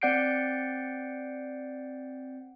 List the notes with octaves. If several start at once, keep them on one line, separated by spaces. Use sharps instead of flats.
C4 D5 F#5 G6 C7 D7